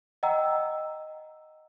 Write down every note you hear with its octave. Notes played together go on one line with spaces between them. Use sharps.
D#5 F#5 G5 A#5 E6